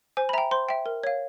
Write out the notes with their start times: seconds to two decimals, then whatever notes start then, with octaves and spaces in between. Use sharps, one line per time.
0.17 C5 G#5
0.29 B5
0.33 E5 A#5
0.38 G5
0.51 C5 C6
0.69 E5 G5
0.86 A#4
1.03 C#5 F5